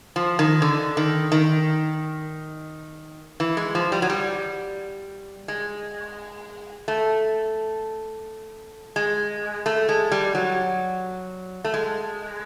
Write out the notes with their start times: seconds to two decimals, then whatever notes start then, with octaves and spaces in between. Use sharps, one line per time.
0.16 F3
0.39 D#3
0.62 D3
0.97 D#3
1.32 D#3
3.40 E3
3.57 G#3
3.75 F3
3.92 G3
4.02 F#3
4.10 G3
5.48 G#3
6.88 A3
8.96 G#3
9.66 A3
9.89 G#3
10.12 G3
10.35 F#3
11.64 A3
11.74 G#3